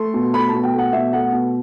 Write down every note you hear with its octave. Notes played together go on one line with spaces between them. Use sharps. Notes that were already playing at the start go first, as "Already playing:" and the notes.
Already playing: A3 C6
B2
A3 B5
B2 A5
G5
A3
F#5
B2 E5
A3 F#5
B2